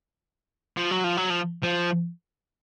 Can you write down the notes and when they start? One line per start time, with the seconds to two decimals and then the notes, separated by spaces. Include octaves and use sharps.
0.77 F3
0.91 F#3
1.04 F3
1.17 F#3
1.30 F3
1.63 F3